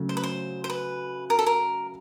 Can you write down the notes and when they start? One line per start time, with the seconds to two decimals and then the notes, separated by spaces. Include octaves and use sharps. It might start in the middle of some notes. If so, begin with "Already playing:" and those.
Already playing: C#3 F#3 A3
0.09 C5
0.17 B4
0.23 C5
0.64 C5
0.70 B4
1.30 A#4
1.39 A4
1.46 A#4